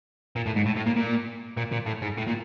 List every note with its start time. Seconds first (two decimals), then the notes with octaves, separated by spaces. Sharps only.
0.36 A#2
0.46 A2
0.56 G#2
0.66 A2
0.76 A2
0.86 A#2
0.97 A#2
1.57 A#2
1.72 A#2
1.86 A2
2.02 G#2
2.17 A2
2.27 A#2